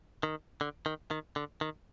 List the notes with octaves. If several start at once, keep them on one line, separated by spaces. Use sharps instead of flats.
D#3
D3
D#3
D#3
D3
D#3